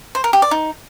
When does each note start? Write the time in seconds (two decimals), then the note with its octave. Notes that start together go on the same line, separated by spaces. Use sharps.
0.15 C5
0.24 A#4
0.33 G4
0.42 D5
0.51 D#4